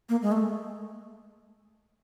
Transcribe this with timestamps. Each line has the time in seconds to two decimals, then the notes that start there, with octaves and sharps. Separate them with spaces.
0.09 A#3
0.22 G#3
0.32 A3